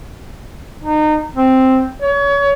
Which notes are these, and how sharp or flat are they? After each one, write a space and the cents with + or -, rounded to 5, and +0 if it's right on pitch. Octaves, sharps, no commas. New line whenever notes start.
D#4 -30
C4 +0
C#5 +30